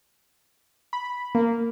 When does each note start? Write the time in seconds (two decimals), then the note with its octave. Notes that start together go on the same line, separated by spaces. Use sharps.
0.93 B5
1.35 A#3